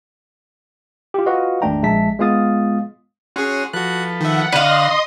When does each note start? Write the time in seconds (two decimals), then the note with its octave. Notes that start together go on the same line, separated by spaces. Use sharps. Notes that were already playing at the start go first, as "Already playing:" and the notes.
1.14 F4 G4
1.26 F4 F#4 B4 D#5 F5 F#5
1.62 G#1 E2 A3 D4 G5 A#5
1.83 A#1 G#3 E5 A5 B6
2.19 G#3 B3 F4 F5 D#6 A6
3.36 C#4 F#4 G#4 C#5 C6
3.73 F3 F#4 A4 B4 F#6
4.21 D#3 E5 F#5
4.52 D3 B4 D5 D#5 F5 C6 D#6